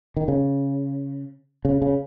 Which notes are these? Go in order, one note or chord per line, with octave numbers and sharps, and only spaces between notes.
D#3
C#3
C#3
C#3